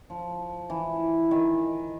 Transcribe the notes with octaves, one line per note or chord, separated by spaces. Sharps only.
F3
E3
D#3